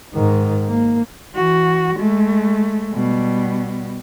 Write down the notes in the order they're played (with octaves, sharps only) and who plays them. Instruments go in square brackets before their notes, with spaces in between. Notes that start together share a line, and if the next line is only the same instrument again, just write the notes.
[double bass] G#2 D#3
A#3
[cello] E3 F#4
G#3 A3
B2 G3